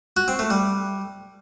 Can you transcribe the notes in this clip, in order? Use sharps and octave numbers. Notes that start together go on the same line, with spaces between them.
F#4
C4
A3
G3